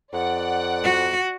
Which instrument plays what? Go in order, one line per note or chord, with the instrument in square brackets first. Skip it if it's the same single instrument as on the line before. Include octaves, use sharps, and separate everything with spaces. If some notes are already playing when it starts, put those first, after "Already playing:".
[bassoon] F2 [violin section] D5 F#5
[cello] F#4